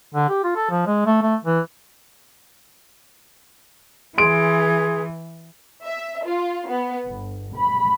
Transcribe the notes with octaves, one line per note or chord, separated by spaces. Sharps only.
D3
G4
F4
A4
F3
G#3
A3
A3
E3
E3 G#4 C6 D7
E5
F4
B3
G1
B5